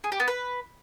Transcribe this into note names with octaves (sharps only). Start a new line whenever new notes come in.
G#4
G4
B3
B4